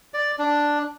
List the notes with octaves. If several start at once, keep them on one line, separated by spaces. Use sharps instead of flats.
D5
D4